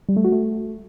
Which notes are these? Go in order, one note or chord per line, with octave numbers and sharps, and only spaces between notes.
G3
A3
F#4
A3